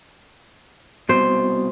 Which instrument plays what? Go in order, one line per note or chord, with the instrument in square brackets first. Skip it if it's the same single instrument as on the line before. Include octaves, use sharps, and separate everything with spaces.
[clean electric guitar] C2 G#2 B2 [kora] C5